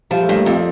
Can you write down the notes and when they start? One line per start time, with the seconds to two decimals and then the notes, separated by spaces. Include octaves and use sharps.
0.11 F3 G3
0.22 A3
0.29 G2
0.35 A#3
0.46 F2 C4